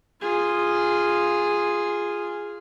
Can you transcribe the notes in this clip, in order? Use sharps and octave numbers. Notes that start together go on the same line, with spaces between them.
F4 G#4